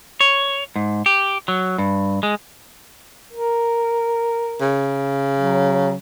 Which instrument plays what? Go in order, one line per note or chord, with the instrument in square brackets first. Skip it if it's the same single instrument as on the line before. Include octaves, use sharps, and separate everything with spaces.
[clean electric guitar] C#5
G#2
G4
F#3
G2
G#3
[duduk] A#4
[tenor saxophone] C#3
[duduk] F#3